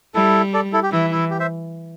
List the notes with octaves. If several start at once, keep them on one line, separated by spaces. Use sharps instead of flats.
G3 E4 A4
A4 D5
E4 A4
G4
E3 E4
E4
G4
C5 E5